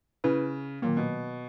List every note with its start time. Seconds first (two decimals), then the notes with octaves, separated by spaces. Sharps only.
0.24 C#3 C#4 E4 B4
0.82 A#2 D#3 F#3 A#3
0.97 B2